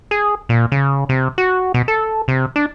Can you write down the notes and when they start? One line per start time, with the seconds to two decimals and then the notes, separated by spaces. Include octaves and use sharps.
0.11 G#4
0.49 A#2
0.72 C#3
1.09 C3
1.38 F#4
1.74 B2
1.88 A4
2.28 C3
2.56 D4